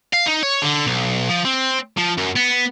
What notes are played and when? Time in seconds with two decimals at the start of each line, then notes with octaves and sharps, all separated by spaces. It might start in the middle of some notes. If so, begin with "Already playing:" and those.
0.13 F5
0.26 D#4
0.43 C#5
0.62 D3
0.87 B1
1.29 F3
1.45 C4
1.98 F3
2.18 F#2
2.36 B3